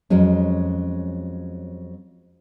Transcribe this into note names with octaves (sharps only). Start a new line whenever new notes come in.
F2 F#3 G#3 C#4